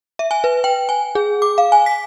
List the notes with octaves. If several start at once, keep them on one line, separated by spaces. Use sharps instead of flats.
E5
G#5
B4
G5
G#5
G#4
D6
F5
G#5
B6